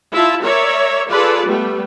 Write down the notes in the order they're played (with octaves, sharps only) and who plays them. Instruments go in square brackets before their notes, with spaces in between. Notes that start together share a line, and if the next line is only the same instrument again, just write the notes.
[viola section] E4 F4 E5 A5
A#4 C#5 D5 E5
F4 G#4 A4 B4 D5
G3 A3 B3